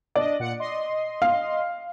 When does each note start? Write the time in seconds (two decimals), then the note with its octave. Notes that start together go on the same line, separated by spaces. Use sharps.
0.16 D4 D5 D#5
0.40 A#2 F#5 C#7
0.60 D#5 C6
1.22 F5